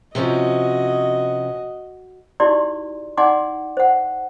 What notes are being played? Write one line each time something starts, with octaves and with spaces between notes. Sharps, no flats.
C3 F3 C#4 F#4 D#5
D#4 E4 F#4 G4 D5 C6
D#4 D5 F#5 G#5 C6 D6
C5 F#5